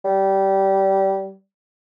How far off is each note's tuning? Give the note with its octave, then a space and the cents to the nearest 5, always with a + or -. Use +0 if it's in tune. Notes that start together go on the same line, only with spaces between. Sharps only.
G3 -20